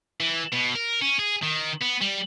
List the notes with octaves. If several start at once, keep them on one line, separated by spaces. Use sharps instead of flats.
E3
B2
A#4
C#4
G#4
D#3
B3
G3